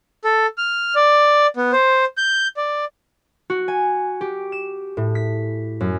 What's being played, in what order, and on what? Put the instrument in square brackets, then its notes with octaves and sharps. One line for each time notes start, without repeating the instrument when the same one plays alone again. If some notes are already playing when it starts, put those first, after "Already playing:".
[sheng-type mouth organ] A4
F6
D5
B3
C5
G6
D5
[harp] F#4
G#5
G4
E7
A2
B6
F#2